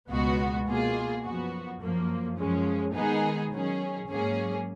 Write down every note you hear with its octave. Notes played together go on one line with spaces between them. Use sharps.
C#2 B2 G#3 B3 F#4
B2 A#3 F4 G#4
F#2 F3 B3 F#4
F#2 F3 A#3
F#2 F3 G#3 C#4
D#3 G#3 B3 D#4 G#4
D#3 F#3 C#4 G#4
G#2 F#3 A#3 C#4 G#4